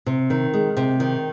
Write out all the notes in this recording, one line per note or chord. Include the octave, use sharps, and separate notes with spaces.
C3
D#3
G#3
C3
D#3